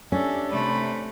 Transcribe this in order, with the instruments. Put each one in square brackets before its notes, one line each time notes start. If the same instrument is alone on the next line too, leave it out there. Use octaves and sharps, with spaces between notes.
[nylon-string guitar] C#4 [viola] D4 G4 [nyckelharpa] A4 E5
[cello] C3 A3 [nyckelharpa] B5